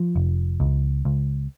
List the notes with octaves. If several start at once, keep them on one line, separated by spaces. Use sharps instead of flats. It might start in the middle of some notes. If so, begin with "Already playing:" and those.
Already playing: F3
F1
C#2
C#2